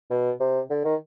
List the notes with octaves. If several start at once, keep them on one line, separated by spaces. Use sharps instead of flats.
B2
C3
D3
D#3